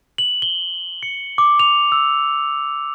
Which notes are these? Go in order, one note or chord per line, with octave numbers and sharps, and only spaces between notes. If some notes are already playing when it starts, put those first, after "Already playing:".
F#7
G7
C#7
D6
F7
E6